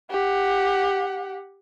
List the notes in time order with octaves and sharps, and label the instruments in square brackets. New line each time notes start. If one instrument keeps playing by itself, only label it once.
[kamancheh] G4 F#5